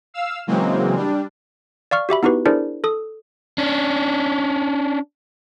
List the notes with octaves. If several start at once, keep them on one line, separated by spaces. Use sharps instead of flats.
F5 E6
C#3 E3 F#3 G#3 A#3 C4
G3 D4
D5 F5 C#6 F6
F#4 G4 E5 B5
B3 D#4 E4 F#4 G4 B4
D4 E4 G#4 A#4 C5 D5
A4 D#6
C#4 D4